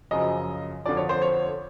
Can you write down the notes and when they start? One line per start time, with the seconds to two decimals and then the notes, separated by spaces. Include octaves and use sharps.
0.11 F#2 C#3 F3 D#5
0.86 F2 D3 F3 D5
0.97 C#5
1.09 C5
1.22 C#5